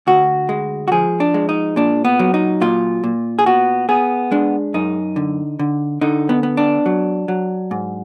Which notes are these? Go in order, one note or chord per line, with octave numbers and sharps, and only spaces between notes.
D2 F#4
G#3
F#4
F3 G#4
D4
G#3
D#4
A#2 D4
B3
F#3
D#4
A#2 F4
A#2
G#4
B3 F#4
B3 G#4
G#3 D4
F#2 D#4
D3
D3
D3 D#4
B3
B3
D4
F#3
F#3
G#2